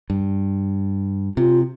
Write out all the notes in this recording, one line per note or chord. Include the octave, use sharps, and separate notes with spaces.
G2
C3 F4